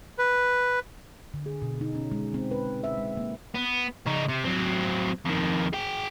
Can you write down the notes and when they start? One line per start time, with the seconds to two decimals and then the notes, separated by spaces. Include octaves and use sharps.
0.18 B4
1.34 D3
1.46 G#4
1.62 B2
1.81 D#4
1.95 C#4
2.12 G#3
2.34 C4
2.51 B4
2.84 E5
2.97 G#3
3.17 A#3
3.54 B3
4.06 C#3 D#4
4.28 C3
4.44 F#3 C4
5.25 F2 D#3
5.73 G#4 G5